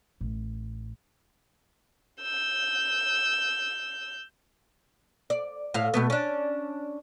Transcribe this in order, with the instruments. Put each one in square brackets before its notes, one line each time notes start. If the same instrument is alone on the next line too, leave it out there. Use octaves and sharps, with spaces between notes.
[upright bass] A1
[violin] E6 G6
[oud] D5
A2 F5
B2 A3 B3
C#4 D4